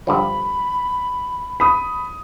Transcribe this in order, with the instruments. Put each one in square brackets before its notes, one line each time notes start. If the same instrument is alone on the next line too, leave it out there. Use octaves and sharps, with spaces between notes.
[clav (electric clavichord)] G2 D3 F3 [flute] B5
[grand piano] B5 D#6